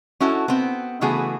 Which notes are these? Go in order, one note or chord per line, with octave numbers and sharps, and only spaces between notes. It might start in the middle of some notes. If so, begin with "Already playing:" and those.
C#4 E4 F#4 A4
B3 C4
C#3 E3 A3 B3 F#4 G#4